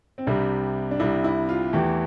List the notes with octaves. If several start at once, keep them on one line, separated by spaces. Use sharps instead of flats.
C4
C2 C3 G3 D4
D4
C2 C3 G3 E4
E4
F4
E2 E3 A3 G4